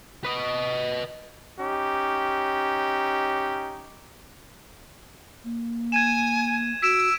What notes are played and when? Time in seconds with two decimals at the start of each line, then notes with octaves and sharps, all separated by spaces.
0.24 B4 D#5
1.60 C#4 D#4 G4
5.44 A#3
5.92 G#5 G#6 D#7 E7
6.82 F#4 E6 B6 D7 E7